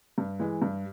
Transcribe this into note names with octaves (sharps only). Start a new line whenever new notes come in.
G2
E3 G#3
G2